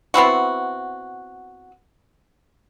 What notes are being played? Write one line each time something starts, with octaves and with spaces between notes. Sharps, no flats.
B3 C4 E4 F#4